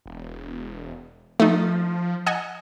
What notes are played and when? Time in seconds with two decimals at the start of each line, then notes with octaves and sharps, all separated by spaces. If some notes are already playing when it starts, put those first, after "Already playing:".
0.06 E1
1.40 F3 A3 D#4
2.26 D#5 F#5 G#5